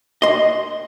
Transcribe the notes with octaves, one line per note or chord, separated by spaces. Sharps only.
D#5 C6